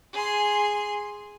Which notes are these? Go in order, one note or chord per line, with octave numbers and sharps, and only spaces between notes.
G#4 C6